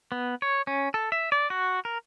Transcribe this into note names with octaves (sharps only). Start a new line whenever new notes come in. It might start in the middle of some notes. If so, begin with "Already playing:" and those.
B3
C#5
C#4
A4
E5
D5
F#4
A#4